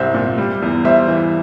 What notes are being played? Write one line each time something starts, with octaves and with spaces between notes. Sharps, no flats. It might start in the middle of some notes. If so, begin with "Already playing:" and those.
Already playing: C2 G3 C5 E5
A#2
G3
E2
G3 C5 E5
E3